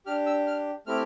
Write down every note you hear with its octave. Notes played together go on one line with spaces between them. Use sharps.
D4 G4 F6
E6
F6
A3 C4 E4 G4 F6